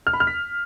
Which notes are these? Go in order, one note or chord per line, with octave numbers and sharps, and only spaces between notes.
F6
B5
F6
B6